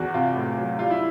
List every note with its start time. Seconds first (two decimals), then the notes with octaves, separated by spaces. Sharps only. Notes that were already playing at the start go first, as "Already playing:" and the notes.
Already playing: E2 F#4
0.14 C3 F4
0.35 A2
0.57 F#3
0.79 G3 F4
0.91 E4